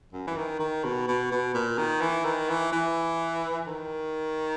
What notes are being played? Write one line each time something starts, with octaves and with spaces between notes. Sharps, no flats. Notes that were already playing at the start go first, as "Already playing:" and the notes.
F#2
E3
D#3
D#3
B2
B2
B2
A#2
D#3
E3
D#3
E3
E3
D#3